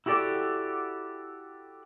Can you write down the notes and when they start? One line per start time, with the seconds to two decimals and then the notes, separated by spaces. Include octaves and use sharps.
0.06 E4 F#4 G4 A4 D5